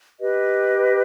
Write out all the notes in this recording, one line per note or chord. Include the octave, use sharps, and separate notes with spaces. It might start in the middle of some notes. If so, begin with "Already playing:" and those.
G4 B4 D#5